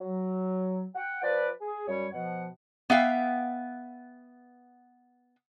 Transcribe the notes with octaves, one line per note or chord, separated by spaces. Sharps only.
F#3
F#5 G5
F3 B4 D5
G#4
F#2 G3 C#5
B2 F3 F#5
B3 E5 F5 G5